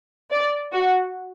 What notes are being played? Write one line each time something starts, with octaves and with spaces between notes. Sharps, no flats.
D5
F#4